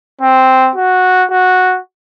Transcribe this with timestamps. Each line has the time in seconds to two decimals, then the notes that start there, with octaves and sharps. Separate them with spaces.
0.21 C4
0.76 F#4
1.30 F#4